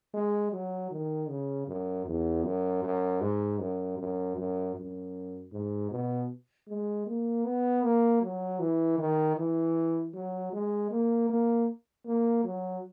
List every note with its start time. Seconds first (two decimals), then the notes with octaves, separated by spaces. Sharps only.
0.14 G#3
0.53 F#3
0.91 D#3
1.29 C#3
1.68 F#2
2.06 E2
2.44 F#2
2.84 F#2
3.21 G#2
3.60 F#2
3.98 F#2
4.38 F#2
4.76 F#2
5.52 G#2
5.91 B2
6.68 G#3
7.07 A#3
7.45 B3
7.83 A#3
8.22 F#3
8.60 E3
8.98 D#3
9.37 E3
10.15 F#3
10.53 G#3
10.91 A#3
11.30 A#3
12.06 A#3
12.44 F#3